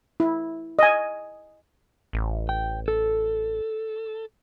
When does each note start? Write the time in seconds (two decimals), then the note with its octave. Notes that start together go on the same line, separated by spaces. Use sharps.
0.20 E4
0.79 D#5 G#5
2.13 A1
2.49 G5
2.88 A4